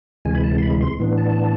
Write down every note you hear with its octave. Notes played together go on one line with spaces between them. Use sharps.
D2 C3 E3 G#3 G#5
B5
A5
C6
B5
C6
A2 E3 B3 D4
A5